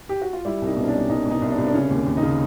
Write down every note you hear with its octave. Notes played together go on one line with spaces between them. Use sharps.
G4
F#4
F4
G3 E4
C2 D#4
B2
C#4
D4
G3
C2 D#4
B2
D#4
C2
D4
C2
D4
C#3 C#4
D#2
D#2
D#4
C#3